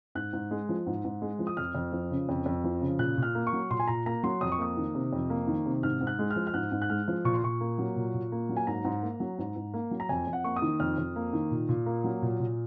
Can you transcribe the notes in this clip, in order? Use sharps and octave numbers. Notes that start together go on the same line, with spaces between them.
G#2 F#6
G#2
G#3
F3
G#2
G#2
G#3
F3
D#6
F2 F6
F2
F3
C#3
F2
F2
F3
C#3
A#2 F#6
A#2
F6
A#3
C#6
F#3
A#2 C6
G#5
A#2 A#5
A#3 A#5
F#3 C6
F2 D#6
C#6
A#3 D#6
D#3
C3
F2
A#3
D#3
C3
G#2 F6
G#2
F#6
G#3
F6
F3
F6
G#2 F#6
G#2
F#6
G#3 F6
F3
A#2 C#6
C6
A#2 C#6
A#3
F#3
A#2
A#2
A#3
F#3
G#5
G#2 A#5
G#2
A#3
F#3
G#2
G#2
A#3
F#3
A#5
F2 G#5
F2
F#5
A#3 C#6
D#6
D#3
F2 F6
F2
A#3
D#3
A#2
A#2
A#3
F#3
A#2
A#2